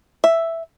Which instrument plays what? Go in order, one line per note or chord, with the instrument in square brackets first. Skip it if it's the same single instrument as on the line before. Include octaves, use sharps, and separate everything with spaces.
[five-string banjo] E5